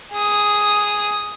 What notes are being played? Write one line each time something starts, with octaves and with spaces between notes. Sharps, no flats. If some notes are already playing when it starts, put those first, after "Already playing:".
G#4 D#6